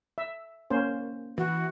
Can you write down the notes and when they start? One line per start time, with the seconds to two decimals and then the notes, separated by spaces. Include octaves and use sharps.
0.18 E5
0.70 A#3 C#4 C5
1.38 E3 F#4